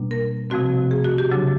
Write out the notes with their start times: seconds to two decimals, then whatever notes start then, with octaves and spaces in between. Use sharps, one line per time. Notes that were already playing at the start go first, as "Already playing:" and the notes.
Already playing: B2 G3 A#3 D4
0.11 A#4
0.50 C3 F3 A3 C4 F#4
0.91 G#4
1.04 F#4
1.18 G4
1.31 C#3 F#3 A3 D4